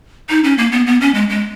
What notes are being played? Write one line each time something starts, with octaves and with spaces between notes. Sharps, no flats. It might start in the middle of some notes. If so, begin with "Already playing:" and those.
D#4
C#4
A#3
B3
B3
C#4
G#3
G#3